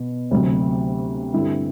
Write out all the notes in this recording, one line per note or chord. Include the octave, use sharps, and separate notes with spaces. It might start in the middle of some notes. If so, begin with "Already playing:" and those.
Already playing: B2 B3
D2 C3 F#3 C4
G2 D3 G3 C4 E4